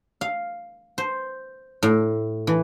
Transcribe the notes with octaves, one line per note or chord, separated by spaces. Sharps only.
F5
C5
A2
E3